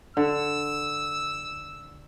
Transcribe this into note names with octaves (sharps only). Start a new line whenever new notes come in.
D3 E6